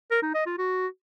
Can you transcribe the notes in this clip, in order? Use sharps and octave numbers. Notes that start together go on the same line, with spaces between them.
A#4
D#4
D#5
F4
F#4